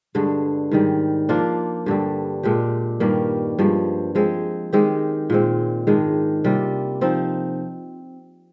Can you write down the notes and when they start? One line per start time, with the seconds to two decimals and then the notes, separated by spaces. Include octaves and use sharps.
0.15 G2 D3 G#3
0.71 G#2 D#3 G3
1.29 F3 A#3 D4 F4
1.86 G2 D3 G3
2.43 A#2 G#3 D4 G4
3.00 G2 D#3 G3 A#3
3.59 G2 F3 G#3
4.15 F3 G#3 C4
4.73 D#3 G#3 C4 G4
5.30 A#2 G#3 C4
5.87 G#2 D#3 G#3 D4
6.44 C3 G3 A#3 F4
7.01 F3 C4 D#4